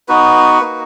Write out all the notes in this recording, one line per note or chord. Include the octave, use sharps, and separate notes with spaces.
B3 D#4 F#4 B4
A#3 D#4 F#4